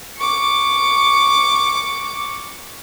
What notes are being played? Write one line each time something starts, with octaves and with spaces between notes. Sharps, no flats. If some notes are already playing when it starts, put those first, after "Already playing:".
C#6 D6